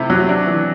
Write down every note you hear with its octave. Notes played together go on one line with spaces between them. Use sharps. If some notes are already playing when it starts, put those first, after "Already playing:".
Already playing: C3 A3 E4
F#3
D4
E3